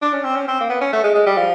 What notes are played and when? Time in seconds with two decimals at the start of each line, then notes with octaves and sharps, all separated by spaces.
0.02 D4
0.13 C#4
0.25 C4
0.36 C#4
0.48 C4
0.61 A#3
0.69 B3
0.81 C#4
0.93 A3
1.04 G#3
1.15 G#3
1.26 G3
1.37 F3